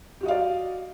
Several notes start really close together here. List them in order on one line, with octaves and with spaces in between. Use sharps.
G4 F#4 D#5 F5 D5